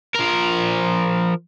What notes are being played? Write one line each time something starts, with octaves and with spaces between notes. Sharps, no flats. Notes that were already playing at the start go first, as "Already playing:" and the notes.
F3 A#4